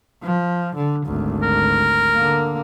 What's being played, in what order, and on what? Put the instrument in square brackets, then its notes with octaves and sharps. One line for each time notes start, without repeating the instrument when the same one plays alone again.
[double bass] F3
D3
G#1 D2
[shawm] A#4
[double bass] D3 A#3